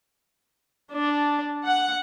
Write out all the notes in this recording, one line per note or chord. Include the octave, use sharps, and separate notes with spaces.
D4
F#5